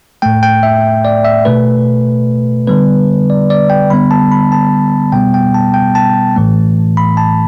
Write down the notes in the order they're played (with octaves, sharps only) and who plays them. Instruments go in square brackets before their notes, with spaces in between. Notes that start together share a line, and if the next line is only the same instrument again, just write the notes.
[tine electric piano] A2 A3 G5
G5
E5
D5
E5
B2 A3 B4
D3 G3 B3 B4
D5
D5
G5
D3 G3 B3 B5
A5
B5
A5
B2 G3 B3 G5
G5
A5
G5
A5
A2 E3 A3
B5
A5